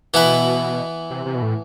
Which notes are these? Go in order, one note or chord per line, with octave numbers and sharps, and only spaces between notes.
B2 E3 B3 E4 B4
C3
C3
B2
A2